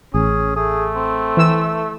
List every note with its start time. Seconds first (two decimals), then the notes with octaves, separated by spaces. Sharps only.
0.14 A1 C#4 G#4
0.56 A3 G#4
0.96 C4
1.37 E3 E6